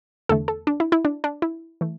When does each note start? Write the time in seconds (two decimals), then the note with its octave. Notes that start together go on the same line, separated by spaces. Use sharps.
0.29 E2 D3 A3 A4
0.48 A4
0.67 D4
0.80 E4
0.92 E4
1.05 D4
1.24 D4
1.42 E4
1.81 E3 A3